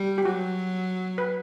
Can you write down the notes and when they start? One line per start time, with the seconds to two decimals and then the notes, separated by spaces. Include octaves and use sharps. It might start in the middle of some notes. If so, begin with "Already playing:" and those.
Already playing: G3
0.18 G4
0.25 F#3 F#4
1.18 B4